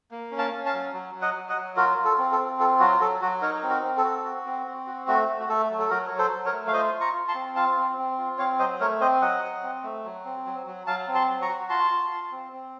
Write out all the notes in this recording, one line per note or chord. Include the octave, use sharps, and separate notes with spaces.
A#3
C#4
F5 A5
C#4
F5 A5
F#3
F#3
F#3
D#5 F#5
F#3
D#5 F#5
F#3
F4 F#4 A#4
F4
A4
C4
A4
C4
F4 A4
F#3 F#4
F#3 A4
F#3 F#4
D#4 A#4 C#5
C4
F#4 A#4
C4
A4
F#4
F#4
C4
C4
F#4
A3 F#4
A3
F#4
A3 A4
F#3
A4
F#3 F#4 A#4
F#3 C#5
A4 C5
F#3
A#4 C#5
A3
F5
F4 C5 D#5
F4
A#5 C#6
F4
A5 C6
C4
F4 F5 A5
C4
C4
F4
C4 C#5 F5
F#3 C5 D#5
A3 A#4 C#5
C4 C5 D#5
F#3 D#5 F#5
F#3
C4
A3
F#3
C4
F#3
F#3
F#3 F5 A5
C4
A5 C6
F#3
A#5 C#6
F#4
F4 A5 C6
F4
F4
C4
C4